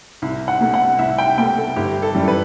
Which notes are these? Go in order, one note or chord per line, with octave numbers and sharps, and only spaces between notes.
C2
F#5
B2 A3
F#5
C2 E5
G5
B2 A3 G5
A4
G1 G4
A4
F#2 E3 G3
B4